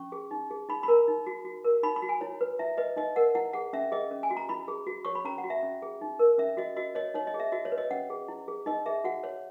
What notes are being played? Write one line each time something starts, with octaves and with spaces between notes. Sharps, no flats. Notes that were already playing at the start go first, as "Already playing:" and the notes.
Already playing: C#4 C#6
G#4
D#4
G#4
D#4 B5
B5
A#4 A#5
D#4
F#4
F#4
A#4
D#4 B5
B5
F#4
G#5
E4 C#5
B4
E4 E5
B4 D#5
D#4 D#5
A#4 F#5
E4 F#5
G#4 F#5
C#4 E5
G#4 D#5
C#4
G#5
F#4
A#5
E4 B5
G#4
F#4
C#5 C#6
B5
C#4 A#5
F#5
F#4
E5
C#4
G#4
D#4
A#4
C#4 E5
F#4 D#5
F#4 D#5
C#5 D#5
D#4 C#5
D#5
G#4
E5
F#4 D#5
C#5
B4
D#5
C#4 F#5
G#4
E4
G#4
D#4 D#5
G#4 E5
F#4 F#5
C#5